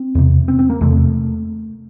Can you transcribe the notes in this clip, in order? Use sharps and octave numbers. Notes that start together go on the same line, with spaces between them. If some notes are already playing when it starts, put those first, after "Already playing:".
Already playing: C4
E2 C3
C4
C4
A#3
E2 C3 A3